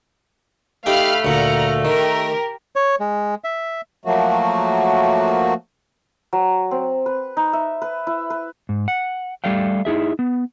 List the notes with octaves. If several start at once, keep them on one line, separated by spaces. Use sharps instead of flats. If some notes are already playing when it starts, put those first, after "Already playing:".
A3 D#4 G4 F5 G5 B5 F6
D2 A#2 F#5 A#5 F6
D#3 G4 A#4
C#5
G#3
E5
F3 F#3 A3 A#3 F#4
F#3
C4
B4
D#4
E5
B4
E4
B4
G#2
F#5
G3 A3 D5 F5 G5
D#4 E4 G#4 E5
B3